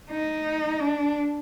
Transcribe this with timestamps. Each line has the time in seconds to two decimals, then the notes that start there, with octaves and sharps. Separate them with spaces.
0.10 D#4
0.80 D4